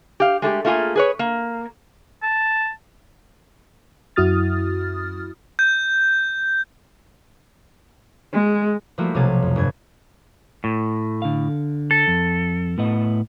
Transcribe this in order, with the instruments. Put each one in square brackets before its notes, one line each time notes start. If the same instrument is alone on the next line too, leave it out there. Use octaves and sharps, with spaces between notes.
[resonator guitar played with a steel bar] G4 F5
G#3 A3 F#4 G4
A3 A#3 F4 F#4 G#4
G#4 B4 C#5
A#3
[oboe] A5
[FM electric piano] F#2 E4 F#4 D#6 F6 A6
[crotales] G6
[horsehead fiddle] G#3
[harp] F3 G3 A3 A#3 E4 F#4
B1 C3 F#3 F5 G#5 A6
F2
G1 G#6
[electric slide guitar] A2
[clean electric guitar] D3 F5
[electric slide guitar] A4
[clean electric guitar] F2
A2 B3 D#5